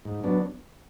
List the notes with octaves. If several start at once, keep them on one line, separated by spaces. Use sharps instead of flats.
G#2
F#3 B3 D4